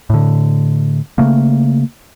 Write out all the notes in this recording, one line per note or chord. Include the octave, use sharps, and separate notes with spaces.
A2 D3
C#3 A3 A#3